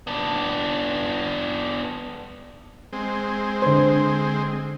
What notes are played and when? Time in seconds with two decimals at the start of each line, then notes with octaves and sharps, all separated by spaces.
0.07 B3 D4
2.93 G#3 C4
3.62 D3 C5